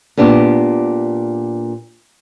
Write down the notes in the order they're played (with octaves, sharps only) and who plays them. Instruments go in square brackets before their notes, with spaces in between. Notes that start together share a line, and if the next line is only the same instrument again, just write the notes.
[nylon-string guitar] A#2 B3 D4 G4